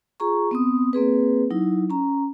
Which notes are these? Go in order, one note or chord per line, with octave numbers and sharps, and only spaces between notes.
F4 G#4 A#5 C#6
B3 C4 D#6
A#3 C4 G#4 B4
F#3 D#4 E4
C#4 A#5